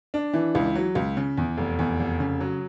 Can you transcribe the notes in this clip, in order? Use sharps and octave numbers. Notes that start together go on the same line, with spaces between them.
D4
E3
C#2
F#3
C#2
C#3
E2
F1
E2
F1
C#3
F#3